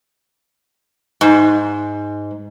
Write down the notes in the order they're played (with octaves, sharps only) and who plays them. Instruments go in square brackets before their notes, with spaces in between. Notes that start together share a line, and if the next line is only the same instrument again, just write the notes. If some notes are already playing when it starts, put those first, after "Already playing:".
[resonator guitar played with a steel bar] G#2